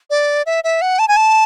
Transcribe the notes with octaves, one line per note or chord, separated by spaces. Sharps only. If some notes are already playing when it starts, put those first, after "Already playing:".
D5
E5
E5
F#5
A5
G#5
A5